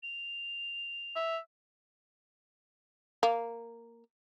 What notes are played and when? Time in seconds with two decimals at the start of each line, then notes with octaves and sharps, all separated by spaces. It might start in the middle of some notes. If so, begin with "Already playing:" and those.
0.03 F7
1.16 E5
3.23 A#3